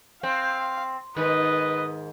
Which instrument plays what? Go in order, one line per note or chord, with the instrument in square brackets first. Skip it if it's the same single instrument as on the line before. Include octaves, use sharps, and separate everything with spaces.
[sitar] C4 [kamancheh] F5
[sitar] G#2 D#3 [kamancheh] B4 D#5